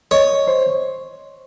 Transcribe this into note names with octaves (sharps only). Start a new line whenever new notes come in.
C#5 D#5
C5